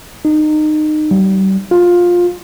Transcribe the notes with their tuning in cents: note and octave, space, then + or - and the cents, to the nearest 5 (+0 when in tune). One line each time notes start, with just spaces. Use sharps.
D#4 -25
G3 -35
F4 +15